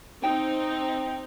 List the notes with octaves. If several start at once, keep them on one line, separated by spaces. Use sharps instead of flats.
C4 D#4 G5